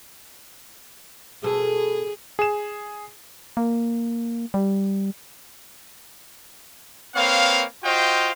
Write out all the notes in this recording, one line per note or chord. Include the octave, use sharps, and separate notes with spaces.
B2 G#4 A4
G#4 E7
A#3
G3
A#3 C4 B4 C#5 F5
F4 F#4 C5 D#5 F5 G5